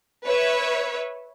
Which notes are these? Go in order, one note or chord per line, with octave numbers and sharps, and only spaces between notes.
B4 C#5 E5